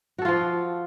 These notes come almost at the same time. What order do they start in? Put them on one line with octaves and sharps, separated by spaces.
F#4 A4 F4 F3